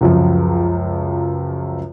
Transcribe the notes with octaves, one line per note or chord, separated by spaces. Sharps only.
C#2 F#2 F3